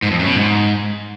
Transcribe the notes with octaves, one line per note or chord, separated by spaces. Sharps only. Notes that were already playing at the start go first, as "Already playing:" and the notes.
G#2
F2
F#2
B2
G#2